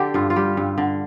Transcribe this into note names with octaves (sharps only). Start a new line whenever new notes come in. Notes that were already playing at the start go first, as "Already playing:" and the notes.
Already playing: D3 G4 A4
G2 F4
F4
G3 G4
G2
D3